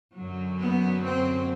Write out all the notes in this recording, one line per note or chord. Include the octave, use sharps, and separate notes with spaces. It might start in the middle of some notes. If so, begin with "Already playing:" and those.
F#2 D3 F#3
B3
C4